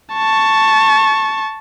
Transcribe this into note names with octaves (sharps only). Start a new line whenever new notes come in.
A5 C#6